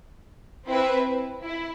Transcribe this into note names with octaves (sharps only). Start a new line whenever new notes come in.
C4 E4 B4 E5
E4